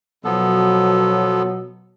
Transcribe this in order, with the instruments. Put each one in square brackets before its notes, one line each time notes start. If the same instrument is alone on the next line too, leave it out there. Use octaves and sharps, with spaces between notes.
[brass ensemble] B2 F#3 [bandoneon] F3 B3 A4